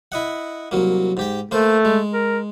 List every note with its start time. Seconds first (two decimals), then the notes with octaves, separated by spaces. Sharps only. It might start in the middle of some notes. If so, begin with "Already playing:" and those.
0.12 E4 D#5 F#5
0.71 C2 F#3 A#3
1.17 G#2 G4 G5
1.51 A3 A#3 C5
1.85 G#3
2.14 A#4